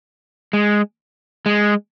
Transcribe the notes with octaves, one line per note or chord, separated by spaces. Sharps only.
G#3
G#3